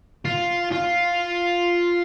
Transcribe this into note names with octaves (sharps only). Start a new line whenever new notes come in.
F4
F4